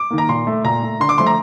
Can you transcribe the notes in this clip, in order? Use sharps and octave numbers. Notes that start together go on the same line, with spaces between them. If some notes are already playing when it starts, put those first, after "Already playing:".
Already playing: D6
D#3 A#3
A#5
A#2 C6
A3
A#2 A#5
A3
D3 C6
D6
F3 A3 C6
A#5